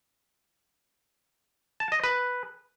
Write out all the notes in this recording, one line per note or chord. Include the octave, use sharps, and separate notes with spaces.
A5
D#5
B4